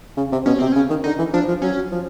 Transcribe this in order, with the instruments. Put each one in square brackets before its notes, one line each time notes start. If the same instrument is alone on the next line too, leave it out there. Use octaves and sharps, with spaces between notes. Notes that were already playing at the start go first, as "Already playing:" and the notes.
[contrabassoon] C#3
C3
[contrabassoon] B2 [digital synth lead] C#4
[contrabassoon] C3 [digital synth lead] C4
[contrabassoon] C#3 [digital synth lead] C#4
[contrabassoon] D#3
[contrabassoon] D3 [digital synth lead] D#4
[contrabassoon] E3
[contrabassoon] F3 [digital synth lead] D4
[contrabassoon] F3
[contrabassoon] F#3 [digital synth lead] C#4
[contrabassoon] F3